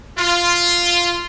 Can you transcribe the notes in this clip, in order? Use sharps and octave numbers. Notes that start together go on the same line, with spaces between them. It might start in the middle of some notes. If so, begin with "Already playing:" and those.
F4